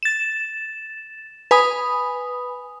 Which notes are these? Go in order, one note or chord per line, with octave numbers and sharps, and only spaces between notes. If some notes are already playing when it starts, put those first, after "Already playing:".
A6 E7
B4 G#5 B5 D#6